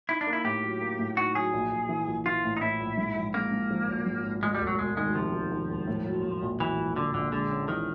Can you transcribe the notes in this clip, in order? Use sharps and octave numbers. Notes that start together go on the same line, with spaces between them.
D#4 E4
D4
A#3
E4
A2 G4
F#3
A#3
A2
D#4 F#4
F#3 G#4
A#1
A#1
E3
A#1
E3 F4
A2
D#4
A2 E4
A#1
G#2
F3
G#2 A#3
G#2
F3
G#1
G#2
G#1
D2 G#3
G3
E1
F#3
E1 G#3
D#3 G#3
C3 F3
D#3
D#3
E1
A2
F#3
A2
A#1
E3 F#3
A#1
A#1 D3
A#1 D3
D3 G#3
C#4
D#3 E3